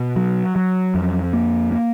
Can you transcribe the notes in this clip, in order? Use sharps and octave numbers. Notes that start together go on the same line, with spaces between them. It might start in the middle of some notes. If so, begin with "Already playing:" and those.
Already playing: B2
F#3
F#3
F2
A#3
A#3